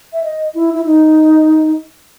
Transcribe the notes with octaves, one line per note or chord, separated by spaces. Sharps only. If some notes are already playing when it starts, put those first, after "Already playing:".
E5
D#5
E4
E4
D#4